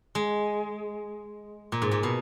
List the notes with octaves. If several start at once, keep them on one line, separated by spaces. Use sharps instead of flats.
G#3
A#2
G#2
A#2
B2